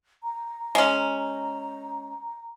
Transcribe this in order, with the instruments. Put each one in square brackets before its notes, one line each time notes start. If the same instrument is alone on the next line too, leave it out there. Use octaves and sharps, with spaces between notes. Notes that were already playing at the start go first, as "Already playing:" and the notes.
[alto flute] A#5
[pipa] G#3 C#4